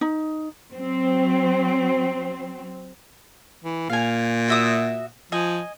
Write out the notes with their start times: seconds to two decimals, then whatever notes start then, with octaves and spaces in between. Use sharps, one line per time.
0.01 D#4
0.72 F#3 C4
3.64 E3
3.90 A#2 F5 G#5
4.48 F#4 E5 D#6
5.32 F3 D#5 G#5